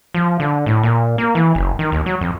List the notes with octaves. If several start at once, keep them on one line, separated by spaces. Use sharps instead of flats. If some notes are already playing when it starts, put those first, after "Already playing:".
F3
D3
A2
A#2
A#3
E3
F#1
D#3
D#2
F#3
F2